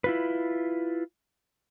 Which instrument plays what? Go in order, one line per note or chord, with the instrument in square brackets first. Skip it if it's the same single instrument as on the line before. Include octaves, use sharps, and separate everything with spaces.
[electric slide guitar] E4 F4 B4